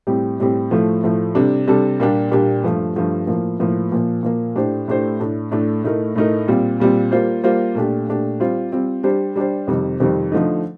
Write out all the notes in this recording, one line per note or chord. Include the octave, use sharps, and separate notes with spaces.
A2 G3 C4 G4
A2 G3 C4 G4
A2 F3 A3
A2 F3 A3
C3 G3 D4 A4
C3 G3 D4 A4
A#2 G3 A#3 D4 G4
A#2 G3 A#3 D4 G4
G2 F3 A3
G2 F3 A3
A2 F3 A#3
A2 F3 A#3
A#2 F3 A#3
A#2 F3 A#3
A2 A3 D4 G4 C5
A2 A3 D4 G4 C5
A2 A3 D4
A2 A3 D4
A2 A3 D#4 A#4
A2 A3 D#4 A#4
A#2 G3 C4 F4
A#2 G3 C4 F4
G3 A#3 F4 C5
G3 A#3 F4 C5
A#2 A3 D4 G4
A#2 A3 D4 G4
G3 C4 F4 C5
G3 C4 F4 C5
G3 D4 G4 C5
G3 D4 G4 C5
F2 C3 D#3 G3 C4
F2 C3 D#3 G3 C4
D3 F3 A3 D#4